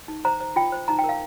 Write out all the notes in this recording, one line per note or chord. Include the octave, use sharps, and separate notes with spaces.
D#4
C5 A#5
C5
F4 G5
C5
D#4 A#5
G5
A#4
F5